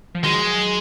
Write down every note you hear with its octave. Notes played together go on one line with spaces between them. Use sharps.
F3
D#3 F#3 G#3